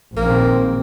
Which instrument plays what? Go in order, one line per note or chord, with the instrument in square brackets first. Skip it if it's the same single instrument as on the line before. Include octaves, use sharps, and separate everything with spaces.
[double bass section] A#1 D#3 C4 [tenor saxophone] A#3